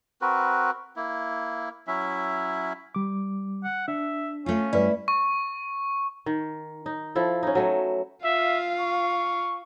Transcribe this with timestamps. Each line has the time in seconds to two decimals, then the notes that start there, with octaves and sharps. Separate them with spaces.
0.21 C4 F#4 A#4 B4
0.96 A#3 E4
1.87 F#3 C#4 E4 E5
2.95 G3 D6
3.64 F#5
3.88 D4 E5
4.46 A3 C#4 F4
4.73 G2 G3 E4 B4 D5
5.08 C#6
6.26 D#3
6.86 D#4
7.15 F3 E4 A4
7.43 C#4 D#4
7.55 F#3 A3 B4
8.24 F4 E5 F5
8.80 C#6